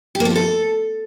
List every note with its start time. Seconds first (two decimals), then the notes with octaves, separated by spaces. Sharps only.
0.15 G4
0.20 A#3
0.25 A4
0.30 F4
0.36 A4